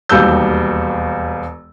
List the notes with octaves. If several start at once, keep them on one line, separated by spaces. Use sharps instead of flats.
E1 D#2 G3 F#4 E6 G6